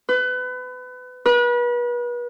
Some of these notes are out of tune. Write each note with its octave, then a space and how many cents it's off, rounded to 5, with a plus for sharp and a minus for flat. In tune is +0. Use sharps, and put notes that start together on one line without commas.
B4 +30
B4 -35